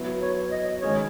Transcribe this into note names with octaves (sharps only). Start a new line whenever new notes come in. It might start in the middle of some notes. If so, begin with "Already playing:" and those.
Already playing: F#3 B3 E4 B4
C#5
D#5
D#3 G#3 C#4 G#4 C#5